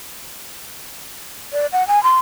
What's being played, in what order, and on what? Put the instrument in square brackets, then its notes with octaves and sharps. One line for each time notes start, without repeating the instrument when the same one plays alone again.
[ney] D5
F#5
G#5
C6